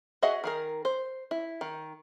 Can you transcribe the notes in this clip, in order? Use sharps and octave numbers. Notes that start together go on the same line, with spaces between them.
F#4 G#4 D#5 E5 F#5
D#3 G#4 A#4
C5
E4
D#3